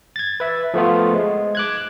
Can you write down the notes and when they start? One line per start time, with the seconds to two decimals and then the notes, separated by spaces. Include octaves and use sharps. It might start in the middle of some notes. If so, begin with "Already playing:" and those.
0.16 G#6 A6
0.40 B4 E5
0.74 F3 A3 B3 F4
1.14 G#3
1.55 D6 F#6 G#6